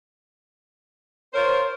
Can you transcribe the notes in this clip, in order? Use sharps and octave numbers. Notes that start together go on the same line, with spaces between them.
F4 A#4 C5 C#5